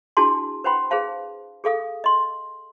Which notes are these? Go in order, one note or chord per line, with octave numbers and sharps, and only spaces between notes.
D4 E4 F#4 G#4 A5 C6
B4 C5 F#5 G5 B5 C6
G#4 B4 C5 F5 A5
G#4 A4 F5 D#6
D#5 C6